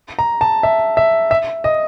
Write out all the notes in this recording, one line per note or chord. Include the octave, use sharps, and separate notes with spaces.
A#5
A5
E5
E5
E5
D#5